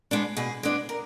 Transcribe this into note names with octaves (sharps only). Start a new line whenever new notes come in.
G#3 B3 D4
B2 G#4
G#3 B3 D4
A#4